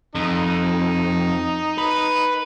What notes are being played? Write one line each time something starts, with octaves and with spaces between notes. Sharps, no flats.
F2 D#4
B4